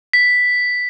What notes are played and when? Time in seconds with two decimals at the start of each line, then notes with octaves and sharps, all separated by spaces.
0.13 B6